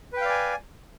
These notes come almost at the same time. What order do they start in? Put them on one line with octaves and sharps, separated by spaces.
B4 G5 F5 D5 G#5